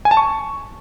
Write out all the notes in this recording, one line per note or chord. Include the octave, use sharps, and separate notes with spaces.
G#5
A5
C#6